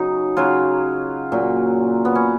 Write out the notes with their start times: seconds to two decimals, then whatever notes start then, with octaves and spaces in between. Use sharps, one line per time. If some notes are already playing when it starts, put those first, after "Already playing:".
Already playing: C#3 F#3 D#4
0.37 C#3 F#3 F4
1.32 A#2 F#3
2.05 B3
2.15 C#4